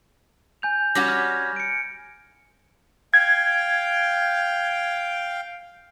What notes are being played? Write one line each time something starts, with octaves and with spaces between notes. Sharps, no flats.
G#5 G6 F7
G3 C#4 F#4 A#6
F6 G#6
C#7 D7
F5 G5 G#6